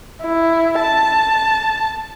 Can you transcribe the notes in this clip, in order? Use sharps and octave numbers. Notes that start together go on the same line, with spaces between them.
E4
A5